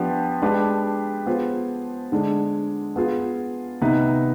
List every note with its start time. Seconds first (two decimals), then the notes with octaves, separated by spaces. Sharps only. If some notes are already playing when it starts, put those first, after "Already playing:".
Already playing: F3 B3 D4 G4 B4
0.42 G#3 D4 G4 B4
1.26 B3 F4 G#4 C5
2.12 D3 G#3 D4
2.96 B3 F4 G#4
3.81 C3 D#3 B3 D#4 B4